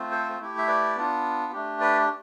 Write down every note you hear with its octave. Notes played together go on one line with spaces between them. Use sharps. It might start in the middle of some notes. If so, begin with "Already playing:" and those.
Already playing: A3 C4 F4
A4 C5
A3 E4 G4
E5
B4 D5
B3 D4 F4
A3 D4 G4
B4 D5